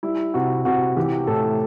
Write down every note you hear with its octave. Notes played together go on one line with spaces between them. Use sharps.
G3 E4
C3 F#4
C3 F#4
E3 G4
A2 A4